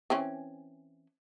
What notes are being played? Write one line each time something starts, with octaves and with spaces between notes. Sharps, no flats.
E3 C4 C#4